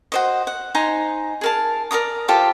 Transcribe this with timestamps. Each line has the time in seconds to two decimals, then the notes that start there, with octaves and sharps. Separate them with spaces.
0.12 F#4 C5 D#5
0.47 F#5
0.75 D#4 C5 G#5 A#5
1.41 G#4 A#4 A5
1.91 A#4 D5 A#5 D#6
2.28 F4 G4 A4 C5